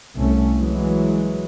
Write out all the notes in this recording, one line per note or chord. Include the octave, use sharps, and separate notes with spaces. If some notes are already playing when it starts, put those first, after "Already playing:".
C2 A3 C#4
E3 F#3 G#3